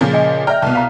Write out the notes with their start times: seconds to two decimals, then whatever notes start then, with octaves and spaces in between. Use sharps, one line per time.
0.01 A#2 C#3 F3
0.13 D#5 G#5
0.47 D5 E5 G5 A#5 F6
0.62 C2 B2 A5
0.75 F5 A#5